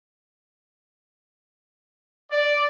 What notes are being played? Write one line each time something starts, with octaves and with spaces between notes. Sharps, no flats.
D5